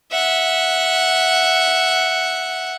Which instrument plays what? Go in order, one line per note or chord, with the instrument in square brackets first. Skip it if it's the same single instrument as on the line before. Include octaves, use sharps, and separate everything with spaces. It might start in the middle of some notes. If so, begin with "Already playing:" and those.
[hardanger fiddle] E5 F#5